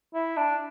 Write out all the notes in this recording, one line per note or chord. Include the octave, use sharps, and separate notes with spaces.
E4
D4